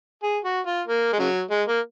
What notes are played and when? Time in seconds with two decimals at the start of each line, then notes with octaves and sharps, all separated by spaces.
0.23 G#4
0.45 F#4
0.66 F4
0.87 A#3
1.13 G#3
1.19 C#3 F#3
1.51 G#3
1.68 A#3